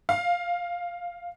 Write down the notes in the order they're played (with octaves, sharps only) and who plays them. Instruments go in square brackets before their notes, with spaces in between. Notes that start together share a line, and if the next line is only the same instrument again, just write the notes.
[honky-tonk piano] F5